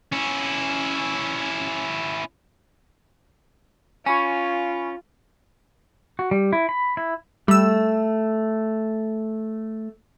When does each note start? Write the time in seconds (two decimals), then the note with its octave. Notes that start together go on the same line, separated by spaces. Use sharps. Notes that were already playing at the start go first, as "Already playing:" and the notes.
0.12 C#4 E4
4.06 C#4 F4 G#5 B5 C#6
6.19 F#4
6.31 G3
6.53 E4
6.69 B5
6.97 E4
7.48 G3 A3 E6